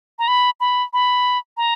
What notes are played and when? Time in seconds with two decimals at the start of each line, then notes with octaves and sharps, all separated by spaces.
0.19 A#5
0.28 B5
0.60 B5
0.93 B5
1.57 A#5